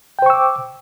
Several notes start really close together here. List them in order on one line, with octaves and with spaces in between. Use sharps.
G5 C5 C#6 E6 D6